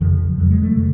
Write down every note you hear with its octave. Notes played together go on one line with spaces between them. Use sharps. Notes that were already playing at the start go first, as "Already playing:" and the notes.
F2 C#3 F3
F2 C#3 F#3
G#3
A3
C#3